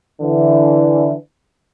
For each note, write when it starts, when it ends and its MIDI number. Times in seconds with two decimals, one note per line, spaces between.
0.22 1.13 50
0.22 1.13 52